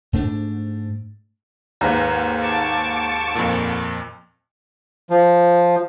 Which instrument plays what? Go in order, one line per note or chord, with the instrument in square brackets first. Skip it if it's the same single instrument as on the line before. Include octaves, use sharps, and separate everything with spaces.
[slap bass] G#2 A3 D4
[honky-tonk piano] D#2 G#2 [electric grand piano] B4 F5 A#5
[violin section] A5 C#6 D6
[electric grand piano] F2 A#2
[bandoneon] F3